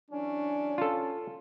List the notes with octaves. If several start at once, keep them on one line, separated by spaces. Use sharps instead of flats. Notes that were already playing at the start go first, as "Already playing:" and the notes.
E3 F#3 C#4 D4
C#4 F4 A4